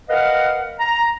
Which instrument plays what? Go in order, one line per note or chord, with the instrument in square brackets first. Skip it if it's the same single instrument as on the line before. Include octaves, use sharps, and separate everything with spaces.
[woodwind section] A#4 B4 D#5 F5 F#5
A#5